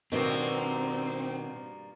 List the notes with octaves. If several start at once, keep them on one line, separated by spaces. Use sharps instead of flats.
G2 B2 D#3 F3 A#3 C4